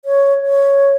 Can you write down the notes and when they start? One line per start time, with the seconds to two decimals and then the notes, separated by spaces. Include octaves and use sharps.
0.05 C#5
0.46 C#5